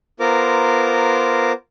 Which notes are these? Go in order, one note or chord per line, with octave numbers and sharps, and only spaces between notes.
B3 F4 A#4 C5 A#5 D6